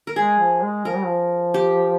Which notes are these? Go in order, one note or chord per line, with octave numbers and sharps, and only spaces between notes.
A#4
G#3 G#4
F3
G#3
F3 A#4
G3
F3
G4